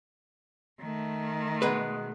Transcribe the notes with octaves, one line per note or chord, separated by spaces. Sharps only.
D#3 A3
B2 G#3 B4